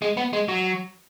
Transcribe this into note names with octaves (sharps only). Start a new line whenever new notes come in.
G#3
B3
G#3
F#3